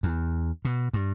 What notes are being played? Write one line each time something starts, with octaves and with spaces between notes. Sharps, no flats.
E2
B2
G2